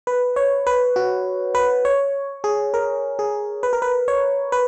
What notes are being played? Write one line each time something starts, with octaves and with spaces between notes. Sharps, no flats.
B4
C#5
B4
F#4
B4
C#5
G#4
A#4
G#4
B4
A#4
B4
C#5
B4